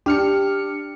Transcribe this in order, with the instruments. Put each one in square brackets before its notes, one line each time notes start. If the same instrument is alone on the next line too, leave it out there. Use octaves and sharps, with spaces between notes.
[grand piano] D4 [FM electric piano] G4 F6 C#7